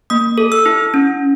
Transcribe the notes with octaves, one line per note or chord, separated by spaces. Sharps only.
A#3 D#6
A4
E6
E4
C#4